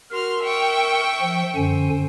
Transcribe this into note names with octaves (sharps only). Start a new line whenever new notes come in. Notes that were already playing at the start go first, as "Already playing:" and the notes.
F#4 A#4 C6 F6
E5 G5 C#6
F3
F#2 D3 C5 G#5